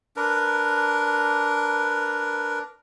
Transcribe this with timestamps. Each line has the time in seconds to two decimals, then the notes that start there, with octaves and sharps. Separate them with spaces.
0.17 D4 A#4 B4